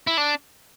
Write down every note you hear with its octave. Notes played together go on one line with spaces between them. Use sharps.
E4
D4